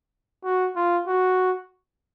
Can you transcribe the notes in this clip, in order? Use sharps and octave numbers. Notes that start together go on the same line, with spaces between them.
F#4
F4
F#4